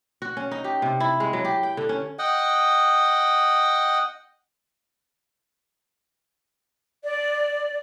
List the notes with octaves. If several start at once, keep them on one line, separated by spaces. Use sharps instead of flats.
F#4
C#4
D#4
G4
C3
E4
G#3
F#3
G4
G5
D3
C#4
D#5 F#5 G5
D5